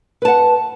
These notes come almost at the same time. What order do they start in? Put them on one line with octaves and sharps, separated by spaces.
B4 A5 F#5